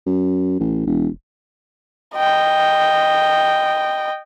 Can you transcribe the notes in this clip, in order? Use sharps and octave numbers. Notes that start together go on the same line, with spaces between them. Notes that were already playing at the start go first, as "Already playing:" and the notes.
F#2
A1
E1
D#5 G5